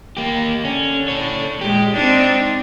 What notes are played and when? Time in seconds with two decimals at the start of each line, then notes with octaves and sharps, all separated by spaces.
0.17 A#3 G4
0.65 D3 C#4
1.08 A4 C#5
1.61 A#2 G#3 G4
1.96 C4 D4 D#4